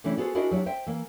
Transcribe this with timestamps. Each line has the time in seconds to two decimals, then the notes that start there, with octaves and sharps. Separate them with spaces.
0.04 C3 E3 A3 C#4 D4 E4
0.17 B3 F#4 G#4 A4 C5
0.35 D4 E4 F#4 G#4 A#4 D#5
0.51 F#3 G3 D4 E4
0.66 C5 E5 G5
0.86 E3 A#3